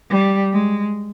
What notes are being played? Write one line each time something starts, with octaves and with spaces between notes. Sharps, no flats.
G3
G#3